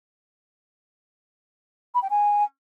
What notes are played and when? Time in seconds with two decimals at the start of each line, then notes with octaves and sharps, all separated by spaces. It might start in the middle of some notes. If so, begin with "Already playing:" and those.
1.95 B5
2.02 G5
2.10 G#5